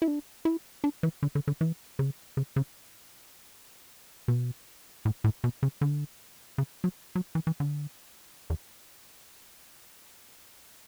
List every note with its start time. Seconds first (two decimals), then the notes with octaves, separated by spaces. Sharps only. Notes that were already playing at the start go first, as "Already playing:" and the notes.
0.02 E4
0.08 D4
0.45 E4
0.84 D4
1.03 E3
1.23 D3
1.35 D3
1.47 D3
1.61 E3
1.99 C#3
2.37 C#3
2.56 C#3
4.28 B2
5.05 A2
5.24 A2
5.44 B2
5.63 C#3
5.81 D3
6.58 C#3
6.84 F#3
7.15 F#3
7.35 E3
7.47 E3
7.60 D3
8.50 E2